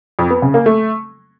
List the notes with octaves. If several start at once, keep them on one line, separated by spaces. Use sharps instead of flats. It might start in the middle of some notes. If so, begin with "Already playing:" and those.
F2
B3
C#3
A#3
A3